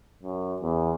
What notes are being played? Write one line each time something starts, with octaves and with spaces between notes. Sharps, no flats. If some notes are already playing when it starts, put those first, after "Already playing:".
F#2
E2